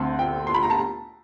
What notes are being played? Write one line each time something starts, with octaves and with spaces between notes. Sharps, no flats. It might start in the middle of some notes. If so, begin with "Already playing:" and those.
Already playing: D2 D3 C4
G5
C6
B5
A#5
A5